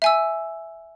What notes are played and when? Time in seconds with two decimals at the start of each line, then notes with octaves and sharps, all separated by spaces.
0.02 E5 G#5 E6